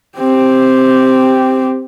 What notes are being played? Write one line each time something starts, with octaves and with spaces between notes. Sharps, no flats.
C4 G4